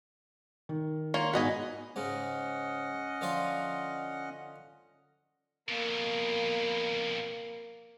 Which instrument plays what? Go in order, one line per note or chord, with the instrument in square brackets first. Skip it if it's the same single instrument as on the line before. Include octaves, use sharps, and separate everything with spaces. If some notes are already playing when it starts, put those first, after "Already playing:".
[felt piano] D#3
[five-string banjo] A#3 F4 C#5
[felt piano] G#2 B3 F#4 [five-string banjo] B4 D#5 G#5
[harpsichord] G#2 C#3 [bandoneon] C#4 D#5 F#5
[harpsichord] D3 F3 F4
[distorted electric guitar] F2 B2 [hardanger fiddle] A#3